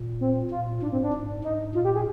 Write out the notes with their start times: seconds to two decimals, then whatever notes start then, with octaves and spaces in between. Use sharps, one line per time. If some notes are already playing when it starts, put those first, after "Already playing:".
Already playing: A#2
0.21 C4
0.51 A#2 F4
0.82 G#2 D4
0.92 C4
1.03 D4
1.13 G#2
1.44 G#2 D#4
1.75 A#2 F4
1.85 G4
1.95 G#4